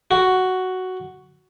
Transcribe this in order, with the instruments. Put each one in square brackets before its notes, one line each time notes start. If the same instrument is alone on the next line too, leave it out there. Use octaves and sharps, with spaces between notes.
[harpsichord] F#4